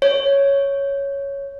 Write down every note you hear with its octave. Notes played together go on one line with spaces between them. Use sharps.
C#5